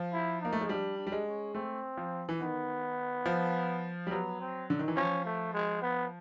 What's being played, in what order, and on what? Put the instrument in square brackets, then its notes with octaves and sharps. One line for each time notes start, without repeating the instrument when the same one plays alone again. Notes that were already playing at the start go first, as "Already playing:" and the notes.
Already playing: [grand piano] F3
[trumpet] E4
[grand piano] A#3 [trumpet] D#4
[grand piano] A3
G#3
[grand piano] G3 [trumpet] D4
[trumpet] D4
[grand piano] G3
G#3
[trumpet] C#4
[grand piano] A3 [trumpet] C4
[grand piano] F3
E3
[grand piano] D#3 [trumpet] B3
[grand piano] F3
G3
[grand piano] F#3 [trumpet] B3
[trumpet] C4
[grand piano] D3
D#3
E3
[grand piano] F3 [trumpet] C#4
[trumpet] A3
G#3
B3